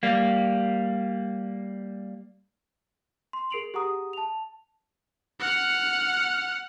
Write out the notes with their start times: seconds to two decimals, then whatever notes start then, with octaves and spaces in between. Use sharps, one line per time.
0.03 G3 A#3
3.33 C6
3.51 G#4 A#4 C7 D7 F7 F#7
3.74 G4 G#4 F#5 A#5 D#6
4.13 A5 F7
5.40 F#5 F6